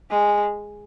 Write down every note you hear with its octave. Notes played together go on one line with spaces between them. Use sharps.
G#3